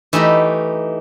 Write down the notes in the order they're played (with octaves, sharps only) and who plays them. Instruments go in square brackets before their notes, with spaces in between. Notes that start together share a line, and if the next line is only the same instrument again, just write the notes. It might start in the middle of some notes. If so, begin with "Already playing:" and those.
[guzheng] E3 A3 D#4 G4 A#5 B5